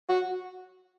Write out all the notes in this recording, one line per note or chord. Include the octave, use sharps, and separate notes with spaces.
F#4